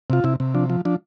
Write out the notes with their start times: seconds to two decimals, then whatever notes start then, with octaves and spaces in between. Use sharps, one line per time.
0.10 C3 F4
0.24 C3 E4
0.40 C3
0.55 F3 D4
0.70 F3
0.85 F3 D4